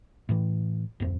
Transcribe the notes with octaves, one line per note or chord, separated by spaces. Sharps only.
A2 E3
D1 G1 F2 C4